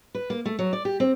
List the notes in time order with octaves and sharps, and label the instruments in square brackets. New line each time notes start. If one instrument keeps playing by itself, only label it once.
[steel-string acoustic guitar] B4
A#3
A3
F#3
D5
G4
C4